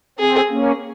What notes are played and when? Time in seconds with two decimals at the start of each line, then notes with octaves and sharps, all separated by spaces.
0.19 C4 G#4
0.50 A#3 C#4